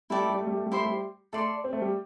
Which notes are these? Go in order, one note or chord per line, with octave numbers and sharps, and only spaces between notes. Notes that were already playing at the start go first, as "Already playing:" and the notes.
G3 E4 A4 D5 G5
A3
G3
A3
G3
A3
G3
A3 E4 C5 E5 C6
G3
A3 A4 D5 C6
C4
A3
G3